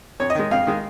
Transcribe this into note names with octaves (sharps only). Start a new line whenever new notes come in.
F2 C#5
D#5
D#3 G#3
F2 F5
D#3 G#3